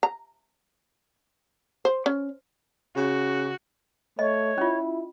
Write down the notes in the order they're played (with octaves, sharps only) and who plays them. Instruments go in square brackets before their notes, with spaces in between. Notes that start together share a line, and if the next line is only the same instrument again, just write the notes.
[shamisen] A#5
C5
C#4
[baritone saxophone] C#3 [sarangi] F#4
[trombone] A3 [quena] C#5 [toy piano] D#5
[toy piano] C#4 F4 [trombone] E4